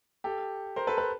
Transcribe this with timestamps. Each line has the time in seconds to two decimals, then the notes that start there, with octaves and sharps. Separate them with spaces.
0.24 G4 A4
0.76 A#4 C5
0.87 A4 B4
0.97 A4 B4